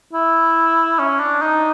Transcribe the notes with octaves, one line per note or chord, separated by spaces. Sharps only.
E4
C#4
D4
D#4